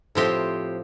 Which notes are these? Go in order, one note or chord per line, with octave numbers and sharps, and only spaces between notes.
A2 F3 C4 G4